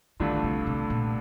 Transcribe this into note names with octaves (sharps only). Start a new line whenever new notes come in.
G2 D3 D#3 A3 D4 F4
C3
C3
A#2